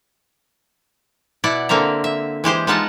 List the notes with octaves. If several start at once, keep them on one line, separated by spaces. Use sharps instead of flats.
B2 E4 D5 F#5
D3 A#3 C4 E5 A#5
E5
E3 G#3 G4 C5
G#3 B3 D#4 F4 F#5 A5